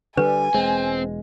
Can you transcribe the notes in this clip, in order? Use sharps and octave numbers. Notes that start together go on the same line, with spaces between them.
D3 G3 B4 G#5
E1 G#3 C4